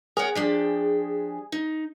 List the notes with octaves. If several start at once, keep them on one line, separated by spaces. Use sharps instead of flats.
G#4 A#4 C#5 F#5
F3 D4 G4
D#4